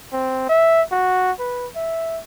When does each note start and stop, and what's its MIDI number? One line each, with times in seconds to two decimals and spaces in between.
0.13 0.48 60
0.49 0.82 76
0.92 1.31 66
1.39 1.67 71
1.75 2.20 76